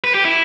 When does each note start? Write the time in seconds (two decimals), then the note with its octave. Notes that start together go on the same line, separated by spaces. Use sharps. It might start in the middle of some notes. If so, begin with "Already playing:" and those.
0.04 B4
0.14 G4
0.25 E4